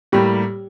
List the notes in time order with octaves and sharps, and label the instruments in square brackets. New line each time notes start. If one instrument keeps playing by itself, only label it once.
[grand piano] A2 G3 A#3 [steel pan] G4